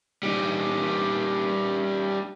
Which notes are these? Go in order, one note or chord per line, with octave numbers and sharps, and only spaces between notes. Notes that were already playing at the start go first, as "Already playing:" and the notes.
G3 D#4